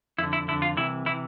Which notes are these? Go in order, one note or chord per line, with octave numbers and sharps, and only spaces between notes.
F2 D3 E4
E4
F2 D3 E4
F4
C2 C3 E3 E4
C3 E3 E4